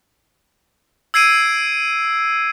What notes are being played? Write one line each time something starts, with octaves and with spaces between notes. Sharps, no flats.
E6 G#6 C7 D7 D#7